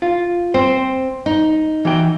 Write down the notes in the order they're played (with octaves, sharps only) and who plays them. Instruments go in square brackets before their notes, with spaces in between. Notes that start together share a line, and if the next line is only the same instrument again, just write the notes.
[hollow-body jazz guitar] F4
[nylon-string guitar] C4 [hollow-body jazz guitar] C5
[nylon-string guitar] D#4
[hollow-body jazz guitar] E3 F#4 G5